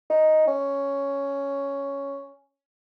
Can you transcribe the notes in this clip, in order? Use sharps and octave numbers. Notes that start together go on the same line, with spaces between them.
D#4
C#4